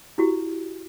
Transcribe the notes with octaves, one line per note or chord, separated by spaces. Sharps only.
E4 F#4 G4